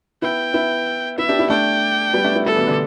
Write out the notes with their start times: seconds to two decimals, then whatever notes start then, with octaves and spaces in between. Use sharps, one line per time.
0.22 B3 E4 G5
0.54 B3 E4
1.18 B3 E4 E5
1.29 D4 G4
1.39 B3 E4
1.50 A3 D4 G5
2.14 G3 B3
2.24 A3 D4
2.35 B3 E4
2.46 G3 B3 A4
2.56 B2 E3
2.67 D3